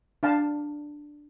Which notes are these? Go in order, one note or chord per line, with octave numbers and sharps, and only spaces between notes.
D4 F5 A5